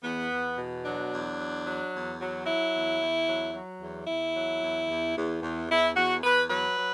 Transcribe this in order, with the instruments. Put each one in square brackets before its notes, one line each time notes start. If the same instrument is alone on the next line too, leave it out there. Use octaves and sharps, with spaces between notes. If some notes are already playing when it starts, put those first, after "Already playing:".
[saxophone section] E2 B3
E2
B2
F#3 D4
E2
F#3
F#3
E2
F#3
F#3 E4
E2
E2
F#3
F#3
E2
E2 E4
F#3
E2
E2
E2
E2
E2 E4
E2 F#4
E2 B4
F#3 B4
F#3